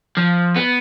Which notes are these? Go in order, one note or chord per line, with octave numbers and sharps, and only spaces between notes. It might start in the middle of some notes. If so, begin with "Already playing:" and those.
F3
B3